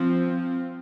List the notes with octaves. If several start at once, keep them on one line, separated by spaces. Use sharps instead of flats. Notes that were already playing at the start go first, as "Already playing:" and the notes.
Already playing: F3 C4